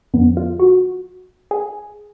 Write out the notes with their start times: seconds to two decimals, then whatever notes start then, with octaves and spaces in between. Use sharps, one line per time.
0.13 F2 D3 F3 B3
0.37 F4
0.60 F#4
1.51 G#4